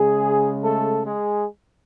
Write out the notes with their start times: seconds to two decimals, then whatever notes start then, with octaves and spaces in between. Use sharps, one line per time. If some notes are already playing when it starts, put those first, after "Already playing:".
Already playing: C#3 G#3 G#4
0.62 A3 A4
1.06 G#3 G#4